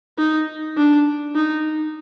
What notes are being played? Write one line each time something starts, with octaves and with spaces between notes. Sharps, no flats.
D#4
D4
D#4